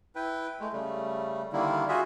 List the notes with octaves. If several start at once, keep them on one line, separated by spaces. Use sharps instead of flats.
E4 B4 G5
G#3 A3
C#3 G3 A3
D3 D#3 G3 A#3 E4
F4 F#4 G#4 E5